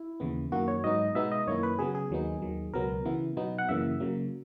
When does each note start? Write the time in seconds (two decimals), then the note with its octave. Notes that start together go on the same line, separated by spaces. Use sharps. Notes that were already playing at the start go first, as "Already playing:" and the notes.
Already playing: E4
0.20 D#2 C#3 E3 B3
0.52 F#2 D#3 A#3 F#4
0.68 C#5
0.84 G#2 F#3 B3 D#4 D#5
1.15 B2 G#3 B3 D#4 E5
1.32 D#5
1.47 F#2 D#3 A#3 E4 C#5
1.63 B4
1.79 C#3 F#3 B3 G#4
1.95 G#4
2.10 D#2 D#3 F#3 B3 D#4
2.42 D#2 D#3 F#3
2.73 C#2 B2 F#3 B3 A#4
3.05 C#3 E3 B3 E4
3.37 B2 F#3 B3 D#4
3.58 F#5
3.69 F#2 C#3 E3 A#3 E5
4.00 C#3 F#3 A#3